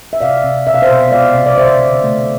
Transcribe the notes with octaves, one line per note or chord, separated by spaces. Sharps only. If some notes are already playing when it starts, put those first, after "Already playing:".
E5
C3 D5 F5
C3
B2 E5
F5
C5 E5
B2
G#3 D5 F5
C3
D5
D3 C5 E5
D3
A3